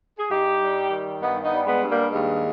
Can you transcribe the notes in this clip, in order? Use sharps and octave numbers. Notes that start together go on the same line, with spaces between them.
G#4
G2 D#4 G4
G3
D#3
G2 B3 D#4
B3 D#4
G3
G#3 B3
G2
G3 A#3
D#2 G#3